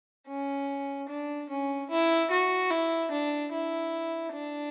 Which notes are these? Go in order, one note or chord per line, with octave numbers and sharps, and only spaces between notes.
C#4
D4
C#4
E4
F#4
E4
D4
E4
D4